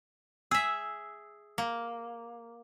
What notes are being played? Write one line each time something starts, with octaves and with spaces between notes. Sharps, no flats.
G#4 E5 E6
A#3